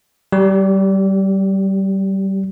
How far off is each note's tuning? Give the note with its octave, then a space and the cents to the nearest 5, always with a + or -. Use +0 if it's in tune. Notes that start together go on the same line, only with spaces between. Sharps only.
G3 -25 G4 +5